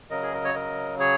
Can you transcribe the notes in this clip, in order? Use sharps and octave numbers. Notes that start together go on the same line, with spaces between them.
C#3 F#3 A#4 D#5
G#4
A#4
C#5
A#4 D#5
G#4 C#5